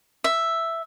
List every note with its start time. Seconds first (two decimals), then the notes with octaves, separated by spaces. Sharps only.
0.24 E5